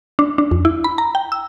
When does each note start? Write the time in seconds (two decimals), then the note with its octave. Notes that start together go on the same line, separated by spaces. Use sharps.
0.19 D4
0.38 D4
0.51 F2
0.65 E4
0.84 B5
0.98 A#5
1.15 G5
1.32 E6